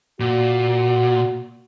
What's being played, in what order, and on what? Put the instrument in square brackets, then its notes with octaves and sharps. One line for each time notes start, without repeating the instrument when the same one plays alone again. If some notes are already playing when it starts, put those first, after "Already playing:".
[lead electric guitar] A#2 [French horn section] F#4